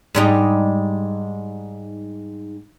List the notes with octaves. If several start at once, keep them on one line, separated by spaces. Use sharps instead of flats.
G#2 G3 D#4